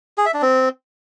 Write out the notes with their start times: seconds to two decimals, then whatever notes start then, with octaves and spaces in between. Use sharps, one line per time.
0.18 G#4
0.26 E5
0.34 D4
0.42 C4